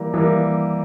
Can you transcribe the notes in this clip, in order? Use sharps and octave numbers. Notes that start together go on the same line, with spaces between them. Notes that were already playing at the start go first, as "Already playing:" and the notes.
Already playing: E3 G3 A#3
E3 G3 A#3